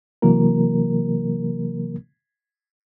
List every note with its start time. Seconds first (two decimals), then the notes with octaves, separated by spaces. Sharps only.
0.22 C3 E3 F#3 A#3 A#4